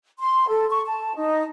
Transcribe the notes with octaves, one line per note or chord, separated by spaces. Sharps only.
C6
A4
C#6
A5
D#4